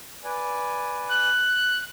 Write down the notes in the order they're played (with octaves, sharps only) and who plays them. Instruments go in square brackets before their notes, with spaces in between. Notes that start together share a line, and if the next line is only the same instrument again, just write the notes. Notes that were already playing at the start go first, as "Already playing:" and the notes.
[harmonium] B4 D5 G#5
[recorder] F#6